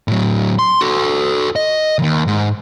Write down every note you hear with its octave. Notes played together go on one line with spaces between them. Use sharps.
A2 F#3
C6
F#4 A4
D#5
D#2 D#3
G#2